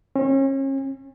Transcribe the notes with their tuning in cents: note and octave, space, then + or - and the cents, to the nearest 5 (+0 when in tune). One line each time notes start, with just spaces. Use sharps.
C#4 -35